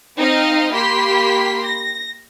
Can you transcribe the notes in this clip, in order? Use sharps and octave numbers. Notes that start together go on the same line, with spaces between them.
C4 D#4 D#5 F5
A#3 G4 B5 C6 B6
A#6